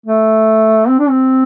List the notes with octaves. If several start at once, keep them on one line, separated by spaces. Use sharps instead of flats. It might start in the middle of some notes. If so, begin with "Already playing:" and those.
A3
C4
D4
C4